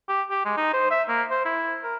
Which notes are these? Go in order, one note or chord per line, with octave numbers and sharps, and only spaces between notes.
G4
G4
G#3
D#4
C5
E5
A#3
C5
E4
A#4